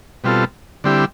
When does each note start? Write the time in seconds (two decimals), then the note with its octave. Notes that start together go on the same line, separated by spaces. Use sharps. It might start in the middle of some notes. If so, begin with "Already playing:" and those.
0.24 B2 G3 C4 F4 A4
0.84 D3 G3 C4 E4 G4